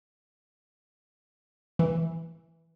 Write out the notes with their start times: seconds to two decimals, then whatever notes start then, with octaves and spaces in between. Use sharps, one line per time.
1.79 E3